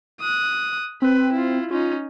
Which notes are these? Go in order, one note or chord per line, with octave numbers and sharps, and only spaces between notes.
D#6 F#6
C4 B4
E4 F4
C#4 D#4 F4